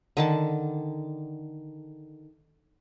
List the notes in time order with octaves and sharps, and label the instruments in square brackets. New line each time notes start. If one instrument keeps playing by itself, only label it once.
[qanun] D3 D#3 A5